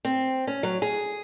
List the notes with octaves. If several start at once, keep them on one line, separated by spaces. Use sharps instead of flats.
C4
C#4
F#3
G#4